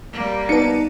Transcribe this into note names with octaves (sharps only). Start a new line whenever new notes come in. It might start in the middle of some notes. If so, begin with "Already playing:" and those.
G3 A#3
B3 D#4 D5 A5 C#7